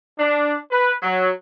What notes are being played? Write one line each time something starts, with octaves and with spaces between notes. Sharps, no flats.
D4
B4
F#3